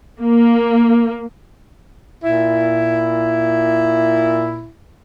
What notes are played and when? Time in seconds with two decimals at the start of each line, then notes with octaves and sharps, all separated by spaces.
0.20 A#3
2.24 A#2 E4